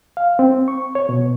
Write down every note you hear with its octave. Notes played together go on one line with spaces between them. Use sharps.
F5
C4
C#6
C#5
B2